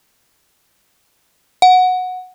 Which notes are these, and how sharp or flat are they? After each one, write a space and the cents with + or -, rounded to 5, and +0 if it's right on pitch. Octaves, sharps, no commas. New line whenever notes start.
F#5 -10